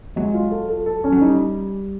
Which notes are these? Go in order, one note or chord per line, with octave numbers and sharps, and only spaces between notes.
F#3 G#3
F4
A4
A4
A4
C#4
F#3
G3 D#4